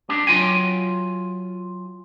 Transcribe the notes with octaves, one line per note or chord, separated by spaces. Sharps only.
D4 G4
F#3 F4 G5 G#5